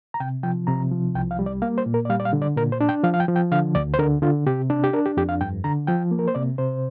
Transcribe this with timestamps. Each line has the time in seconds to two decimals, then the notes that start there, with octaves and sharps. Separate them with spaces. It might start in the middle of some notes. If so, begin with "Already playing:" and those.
0.14 A#5
0.20 C3 G5
0.43 F3 G5
0.67 C3 A#5
0.91 F3
1.15 C2 G5
1.31 F5
1.39 G3
1.46 D5
1.62 A#3 F5
1.78 C5
1.86 A#2
1.94 A#4
2.05 D5
2.10 G3 F5
2.20 D5
2.25 F5
2.33 D3
2.42 D5
2.56 A#2 A#4
2.72 C5
2.81 D4
2.89 G5
3.03 F3 F5
3.14 F5
3.20 G5
3.28 F3
3.36 G5
3.51 D3 F5
3.75 D2 D5
3.94 C5
3.99 D3 A#4
4.22 D3 F4
4.46 C3 G4
4.70 D4
4.84 G4
4.93 D4 A#4
5.06 G4
5.17 F2 G4
5.29 F5
5.41 G2 G5
5.64 D3 A#5
5.87 F3 G5
6.11 A#3
6.19 A#4
6.28 C5
6.35 C3 D5
6.58 C3 C5